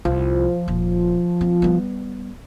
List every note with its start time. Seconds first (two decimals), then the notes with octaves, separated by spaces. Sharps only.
0.05 C2 F3
0.68 D#1
1.41 C4
1.62 G3 B3